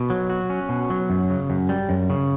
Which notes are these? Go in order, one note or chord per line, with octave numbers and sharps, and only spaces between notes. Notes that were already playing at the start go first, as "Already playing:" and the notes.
Already playing: B2
F#3
F#4
C#4
B2
F#3
F#2
C#3
F#2
G3
F#2
C#3